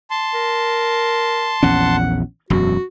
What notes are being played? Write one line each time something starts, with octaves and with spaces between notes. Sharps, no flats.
A5 C6
A#4
A#1 E2 C#4 F#5
E1 F#2 F#4